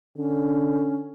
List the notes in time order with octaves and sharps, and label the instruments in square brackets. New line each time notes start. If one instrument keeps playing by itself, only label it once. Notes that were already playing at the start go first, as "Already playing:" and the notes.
[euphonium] D3 [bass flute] C#4